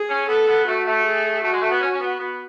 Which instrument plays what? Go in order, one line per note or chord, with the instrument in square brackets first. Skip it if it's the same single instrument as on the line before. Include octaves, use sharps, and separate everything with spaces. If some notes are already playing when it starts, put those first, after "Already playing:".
Already playing: [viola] G#4
[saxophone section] C#4
[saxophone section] B3 [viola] A4
[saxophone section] B3
[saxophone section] A3 [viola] F#4
[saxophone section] A3
[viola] G#4
[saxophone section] A3 [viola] F#4
[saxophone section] G#3
A3
B3
C#4
C#4
B3
B3